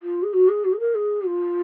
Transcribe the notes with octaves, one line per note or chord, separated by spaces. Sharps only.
F4
G#4
F#4
G#4
F#4
G#4
A#4
G#4
F4